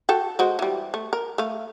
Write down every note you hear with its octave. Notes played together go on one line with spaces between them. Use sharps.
F#4 A4 G5
G#3 F#4 C5
E3 G3
A3
A#4
A3 F5